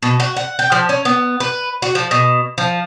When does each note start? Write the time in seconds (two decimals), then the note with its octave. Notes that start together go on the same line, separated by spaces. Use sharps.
0.03 B2
0.20 F#4
0.37 F#5
0.59 G5
0.72 F3
0.89 C#4
1.05 B3
1.40 B4
1.82 F#4
1.95 F3
2.11 B2
2.58 F3